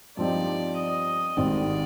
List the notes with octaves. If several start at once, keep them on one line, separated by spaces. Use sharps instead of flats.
G2 F3 C4 D#4 G4 D5
D#5
G#1 G#2 D#3 G3 C4 D5